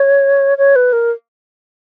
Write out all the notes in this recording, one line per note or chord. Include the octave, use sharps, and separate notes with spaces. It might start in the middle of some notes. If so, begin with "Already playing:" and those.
Already playing: C#5
C#5
B4
A#4